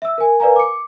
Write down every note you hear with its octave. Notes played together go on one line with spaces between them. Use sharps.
E5 E6
A#4 G#5
A#4 B4 D5 F5 G#5 A#5
D6 C#7